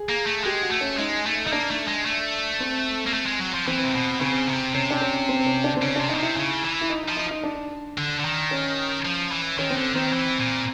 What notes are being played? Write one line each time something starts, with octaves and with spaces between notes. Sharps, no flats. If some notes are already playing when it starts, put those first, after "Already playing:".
Already playing: G#4
A#3
A3
G#3 G4
F#4
A3
C#4
G#3 D#4
A3
A3 D#4
A#3 D4
A3
G#3
A3
C4
A#3
A3
G#3
F#3
F3
E3 C4
C3
B2
C#3 C4
C3
C3 C#4
D4
C#4
C4
C#4
D4
C4
C#3 C#4
C3 D4
D#4
B2
C3 E4
C#3
E3
E4
D#4
D#4
F3
D#4
D#4
D4
D3
D3
D#3
C#4
F3
E3
D#3 C#4
C4
D3
D#3 C4
E3
A#2